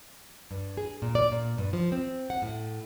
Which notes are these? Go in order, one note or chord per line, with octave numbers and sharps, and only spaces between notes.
G2
G#4
A#2
D5
A#2
G2
F3
C4
F#5
A2